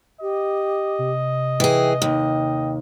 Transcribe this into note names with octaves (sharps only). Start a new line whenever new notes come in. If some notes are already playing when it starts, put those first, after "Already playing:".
G4 D#5
C3
E3 G#4 G5
D#2 G5